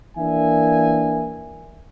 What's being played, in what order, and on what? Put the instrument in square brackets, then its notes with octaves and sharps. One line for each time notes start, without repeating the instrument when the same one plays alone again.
[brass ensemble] E3 A#3 D4 E5 G#5